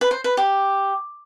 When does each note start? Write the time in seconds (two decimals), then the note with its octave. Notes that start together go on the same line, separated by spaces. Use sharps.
0.01 B4
0.11 C5
0.24 B4
0.37 G4